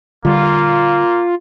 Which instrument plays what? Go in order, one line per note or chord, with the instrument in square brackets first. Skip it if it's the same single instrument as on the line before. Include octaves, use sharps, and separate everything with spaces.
[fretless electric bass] D3 G3 [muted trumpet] A#3 [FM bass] F4